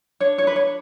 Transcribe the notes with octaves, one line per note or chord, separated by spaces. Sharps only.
D4 C#5
C#5
D4 B4
C#5